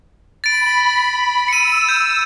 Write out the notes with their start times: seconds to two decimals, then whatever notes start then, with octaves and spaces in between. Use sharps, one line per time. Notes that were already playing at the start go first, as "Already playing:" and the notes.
0.44 B5 A6 D7
1.11 B5
1.48 E6 C#7 D#7
1.89 G6